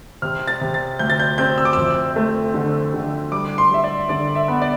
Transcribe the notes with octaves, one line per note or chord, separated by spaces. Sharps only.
C3 F6
A6
C3
A6
D2 G6
A6
G6
C4 G6
E6
D6
F2 E6
A3
D3
D3
G3 D6
C6
G3 E5
D5
D3 D5
E5
B3
D5